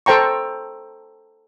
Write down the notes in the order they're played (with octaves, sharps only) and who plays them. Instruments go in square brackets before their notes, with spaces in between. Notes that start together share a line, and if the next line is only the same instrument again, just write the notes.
[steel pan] A4 C5 G5 A#5 C#6